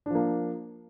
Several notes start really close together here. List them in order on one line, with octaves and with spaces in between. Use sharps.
D4 F3 A#3